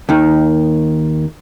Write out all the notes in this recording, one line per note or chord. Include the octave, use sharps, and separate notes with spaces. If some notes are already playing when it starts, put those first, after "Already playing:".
D#2 D#3